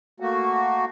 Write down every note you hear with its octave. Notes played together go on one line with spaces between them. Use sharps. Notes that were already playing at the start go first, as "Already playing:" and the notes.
A3 A#3 F#4